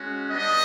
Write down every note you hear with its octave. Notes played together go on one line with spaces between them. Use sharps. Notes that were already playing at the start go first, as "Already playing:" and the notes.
Already playing: G#3 C#4 F#4
G3 B3 D4 D#5